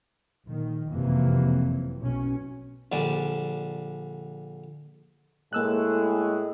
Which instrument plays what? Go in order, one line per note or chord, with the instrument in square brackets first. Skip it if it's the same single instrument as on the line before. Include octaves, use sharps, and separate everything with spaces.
[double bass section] A#1 D#3
F#1 F2 C3 E3 F#3 A#3
B1 C#4
[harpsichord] A#1 D3 G3 G#5 A5
[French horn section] A2 G#3 [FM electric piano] A#3 E6 F#6